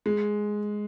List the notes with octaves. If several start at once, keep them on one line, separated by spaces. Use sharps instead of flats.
G#3